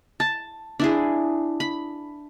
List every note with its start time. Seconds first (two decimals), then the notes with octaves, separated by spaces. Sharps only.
0.20 A5
0.80 D4 E4 G#4
1.60 B5